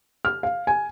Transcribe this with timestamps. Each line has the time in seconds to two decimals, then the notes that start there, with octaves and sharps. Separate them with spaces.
0.25 F6
0.43 F5
0.67 G#5